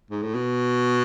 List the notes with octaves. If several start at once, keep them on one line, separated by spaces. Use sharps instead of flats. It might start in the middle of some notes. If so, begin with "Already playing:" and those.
G#2
A2
B2